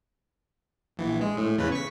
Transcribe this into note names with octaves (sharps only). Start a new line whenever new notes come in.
A#1 E3
G#3
A2
E2 C#3 B4
C#6 B6